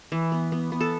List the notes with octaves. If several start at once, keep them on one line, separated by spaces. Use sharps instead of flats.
E3
B3
B3
B3
A4